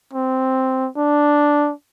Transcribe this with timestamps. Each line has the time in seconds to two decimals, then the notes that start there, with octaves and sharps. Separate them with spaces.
0.13 C4
0.97 D4